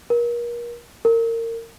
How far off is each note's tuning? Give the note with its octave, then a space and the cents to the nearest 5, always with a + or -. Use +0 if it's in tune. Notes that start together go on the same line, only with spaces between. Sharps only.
A#4 +35
A#4 -30